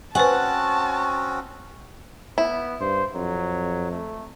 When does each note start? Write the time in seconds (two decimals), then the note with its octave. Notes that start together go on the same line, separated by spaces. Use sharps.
0.15 C4 C#4 F#4 B4 C5 F#5 G#5 A5
2.38 B3 E4
2.81 G2 C5
3.15 F2 F#3
3.91 A3